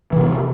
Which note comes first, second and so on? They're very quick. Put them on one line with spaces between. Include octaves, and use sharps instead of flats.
E3 C3 B3